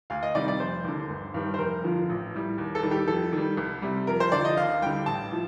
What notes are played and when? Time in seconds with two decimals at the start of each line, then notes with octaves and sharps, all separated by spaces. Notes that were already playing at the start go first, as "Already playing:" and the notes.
0.10 D2 F5
0.23 D#5
0.35 C3 D#3 G3 D5
0.48 D5
0.60 F1 C5
0.84 D#2 D3
1.10 G1
1.34 G2 D#3 G3
1.54 C5
1.59 F1 A#4
1.84 F2 D3 F3
2.09 A1
2.34 A2 G3
2.58 D#2
2.75 A4
2.83 D#3 G3
2.91 G4
3.08 F2 A4
3.33 D#3 G3
3.57 C2
3.82 C3 G3
4.07 F2 A#4
4.20 C5
4.32 D3 F3 D5
4.45 D#5
4.57 D#2 F5
4.82 D3 G3 G5
5.06 A1 A5
5.32 A2 F3